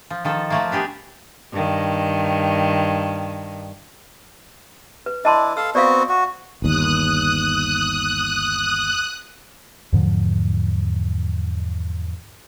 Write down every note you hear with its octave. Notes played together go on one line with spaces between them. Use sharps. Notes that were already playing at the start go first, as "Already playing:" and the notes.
F3
D#3 F3 A4
F3 A3 A#3
B3 D4 G4 G#4
G2 D#3
B4
D4 E4 D#5 A5 C6
A4 F5 E6
B3 C4 F#4 D5 F5
F#4
G1 D#2 D#6 F#6
E2 G#2 D3 F3